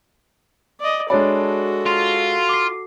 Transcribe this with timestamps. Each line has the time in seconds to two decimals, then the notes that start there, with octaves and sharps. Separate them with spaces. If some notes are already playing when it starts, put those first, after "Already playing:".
0.80 D5 D#5
1.10 G#3 D4 F#4 A4 C#5 D5 B5
1.86 F4
2.49 D6 C7